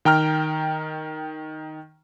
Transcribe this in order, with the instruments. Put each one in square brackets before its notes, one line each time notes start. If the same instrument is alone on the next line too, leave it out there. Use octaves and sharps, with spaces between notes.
[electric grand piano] D#3 G5 A#5 F6